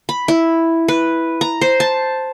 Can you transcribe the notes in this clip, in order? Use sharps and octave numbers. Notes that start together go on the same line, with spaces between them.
B5
E4
B4
A#5
C5
A5